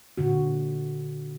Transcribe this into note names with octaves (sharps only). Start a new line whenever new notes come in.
A#2 D3 F#4